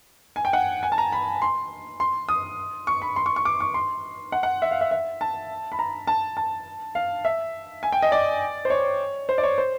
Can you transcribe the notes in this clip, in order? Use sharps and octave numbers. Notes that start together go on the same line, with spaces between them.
G#5
G5
F#5
G#5
A5
A#5
B5
C6
C6
D#6
C#6
B5
C6
C#6
C#6
D6
C#6
C6
F#5
F#5
E5
F5
E5
E5
A5
B5
A#5
A5
A5
F5
E5
G#5
G5
D#5
D5
C5
C#5
C5
D5
C#5
C5